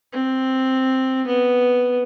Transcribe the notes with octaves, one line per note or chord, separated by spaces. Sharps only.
C4
B3